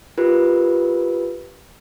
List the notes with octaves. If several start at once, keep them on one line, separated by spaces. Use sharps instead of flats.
F4 G4 A#4 B4